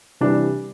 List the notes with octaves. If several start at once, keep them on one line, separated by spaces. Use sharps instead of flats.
C3 E3 G3 D4